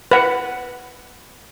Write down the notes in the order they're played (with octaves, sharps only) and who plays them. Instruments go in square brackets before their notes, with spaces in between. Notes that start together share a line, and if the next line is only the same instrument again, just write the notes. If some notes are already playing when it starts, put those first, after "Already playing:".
[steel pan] B4 F#5